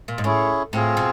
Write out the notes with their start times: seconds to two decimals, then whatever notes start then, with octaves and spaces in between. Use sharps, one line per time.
0.08 A#2
0.18 G#2
0.24 A2 C#4 E4 G#4
0.73 A2 C4 F4 G#4
0.97 B2